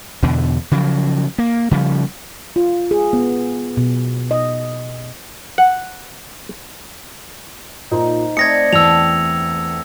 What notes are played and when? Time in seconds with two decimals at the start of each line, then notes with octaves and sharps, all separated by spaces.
0.23 E2 B2 D3
0.71 C#3 F3 F#3
1.38 A#3
1.71 C#3 F3 G3
2.56 F4
2.91 G#4
3.13 B3
3.77 B2
4.31 D#5
5.58 F#5
7.91 A#2 D#4 C5
8.37 A3 C4 D5 D#6 G#6 A#6 C#7
8.73 E2 G5 A5 E6 F7